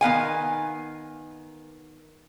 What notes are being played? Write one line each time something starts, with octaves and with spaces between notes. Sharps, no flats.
D#3 B3 F5 G#5